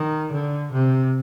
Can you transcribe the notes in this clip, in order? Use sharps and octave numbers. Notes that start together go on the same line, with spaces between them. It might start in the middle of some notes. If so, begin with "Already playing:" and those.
Already playing: D#3
D3
C3